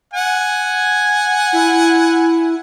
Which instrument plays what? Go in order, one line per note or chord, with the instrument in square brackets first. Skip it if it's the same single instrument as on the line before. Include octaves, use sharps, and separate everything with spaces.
[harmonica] F#5 G#5
[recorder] E4